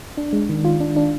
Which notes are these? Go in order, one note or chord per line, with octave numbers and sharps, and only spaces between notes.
D4
G#3
D#3
F4
D4
D4